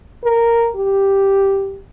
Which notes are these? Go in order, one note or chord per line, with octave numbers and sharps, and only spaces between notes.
A#4
G4